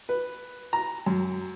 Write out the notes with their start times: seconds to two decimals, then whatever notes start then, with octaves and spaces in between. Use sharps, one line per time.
0.09 B4
0.73 A#5
1.06 F#2